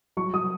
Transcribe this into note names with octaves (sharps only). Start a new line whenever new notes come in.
F#3 C#6
F#3 D#6